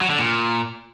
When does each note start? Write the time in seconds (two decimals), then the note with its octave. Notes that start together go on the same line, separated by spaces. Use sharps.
0.01 F#3
0.10 D3
0.19 A#2